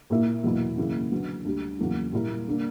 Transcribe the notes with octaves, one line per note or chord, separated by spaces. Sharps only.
A#2 A#3 E4 A#4 E5
E2 B2 F#3 A#3 E4
F#2 C#3 E3 A#3 E4
D3 F#3 B3
D2 D3 G3
E2 C#3 F#3 A#3 E4
A#2 G3 A#3 E4 A#4
D3 A#3 D4